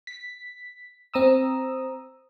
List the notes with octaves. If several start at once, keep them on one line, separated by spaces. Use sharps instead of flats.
B6
C4 A#5 D#6 E6